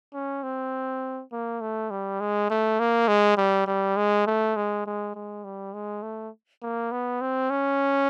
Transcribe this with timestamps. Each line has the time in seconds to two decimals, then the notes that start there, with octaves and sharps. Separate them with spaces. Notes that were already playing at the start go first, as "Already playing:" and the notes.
0.13 C#4
0.43 C4
1.32 A#3
1.61 A3
1.91 G3
2.21 G#3
2.50 A3
2.80 A#3
3.08 G#3
3.37 G3
3.67 G3
3.97 G#3
4.27 A3
4.56 G#3
4.86 G#3
5.15 G#3
5.45 G3
5.73 G#3
6.03 A3
6.62 A#3
6.92 B3
7.21 C4
7.50 C#4